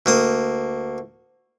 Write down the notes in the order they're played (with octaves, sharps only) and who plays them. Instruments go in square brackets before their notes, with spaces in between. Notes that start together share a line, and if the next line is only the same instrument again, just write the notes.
[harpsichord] D2 A#3 D#6